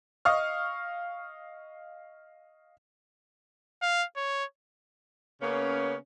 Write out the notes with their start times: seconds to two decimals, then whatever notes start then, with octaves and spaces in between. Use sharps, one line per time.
0.25 D#5 F5 C#6 D#6 F6
3.82 F5
4.16 C#5
5.41 C#3 A#3 B3 C#4